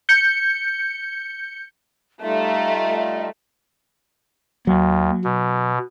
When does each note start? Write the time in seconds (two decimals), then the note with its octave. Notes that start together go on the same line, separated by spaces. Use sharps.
0.09 G6 C#7
2.22 G3 A3 D#4 F4 E5
4.67 D#2 F#3
5.24 B2